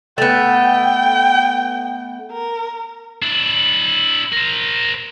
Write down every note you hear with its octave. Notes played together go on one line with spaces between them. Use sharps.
A3 B3 G5
A#4
D4 E4
A#4 C5